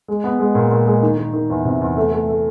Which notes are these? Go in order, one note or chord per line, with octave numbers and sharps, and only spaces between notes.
G#3
B3
G#3
A#2
A#2
G#3
D#3
D#3
D#3
E2
C3
E2
A3
A3
A3